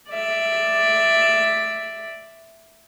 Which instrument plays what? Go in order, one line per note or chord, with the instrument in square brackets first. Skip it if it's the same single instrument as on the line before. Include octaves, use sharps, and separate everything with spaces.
[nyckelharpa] D5 E5